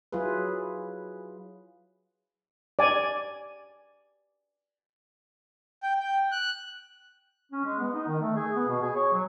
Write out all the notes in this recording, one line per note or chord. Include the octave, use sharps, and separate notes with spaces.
F#3 E4 F4 G#4 B4
D5 G#5
G5
G5
F#6
C#4
G#3
B3
D#4
D#3
A3
G#4
B3
B2
G#4
C#5
F#3